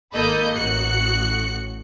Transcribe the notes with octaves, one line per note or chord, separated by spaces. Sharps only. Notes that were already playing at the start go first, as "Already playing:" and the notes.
G#1 A#3 A4 D#5 B5 G6
A1 F#4 F#6 C#7